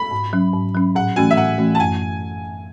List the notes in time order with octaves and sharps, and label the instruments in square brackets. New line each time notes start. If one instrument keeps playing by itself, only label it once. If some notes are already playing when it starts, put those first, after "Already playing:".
Already playing: [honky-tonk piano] B5
[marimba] G#2
F#3 C#4
G#2
F#3 C#4
[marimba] A2 [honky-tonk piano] F#5
[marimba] E3 A3 C#4 F#4 [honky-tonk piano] G#5
[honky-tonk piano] E5
[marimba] A2 [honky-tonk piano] F#5
[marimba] E3 A3 C#4 F#4
[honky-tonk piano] A5
[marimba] F#2 [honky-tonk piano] G#5